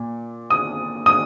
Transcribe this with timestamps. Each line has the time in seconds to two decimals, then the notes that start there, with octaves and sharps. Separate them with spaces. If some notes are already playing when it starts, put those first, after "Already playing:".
Already playing: A#2
0.50 D#6
1.06 D#6